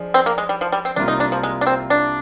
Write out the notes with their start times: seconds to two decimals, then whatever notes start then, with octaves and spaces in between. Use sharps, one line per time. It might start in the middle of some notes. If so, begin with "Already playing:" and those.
Already playing: F3 G#3 D4 G#4
0.14 C4
0.26 A#3
0.38 G#3
0.49 G3
0.61 F3
0.72 G3
0.85 C4
0.96 C2 C3 G3 A#3 D4 F4
1.08 D#4
1.20 D4
1.32 F3
1.43 G#3
1.61 D4
1.67 C4
1.90 D4